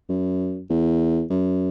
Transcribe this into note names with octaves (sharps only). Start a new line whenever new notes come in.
F#2
E2
F#2